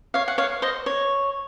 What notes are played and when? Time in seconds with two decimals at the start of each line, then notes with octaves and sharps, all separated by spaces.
0.14 C#5 F5
0.28 F#5
0.38 C#5 F5
0.62 C5 D#5
0.86 C#5